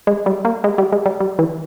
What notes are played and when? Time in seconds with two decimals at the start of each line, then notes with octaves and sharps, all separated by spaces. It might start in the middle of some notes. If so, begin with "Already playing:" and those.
0.07 G#3
0.26 G3
0.45 A#3
0.64 G#3
0.78 G3
0.92 G#3
1.05 G3
1.20 G3
1.39 E3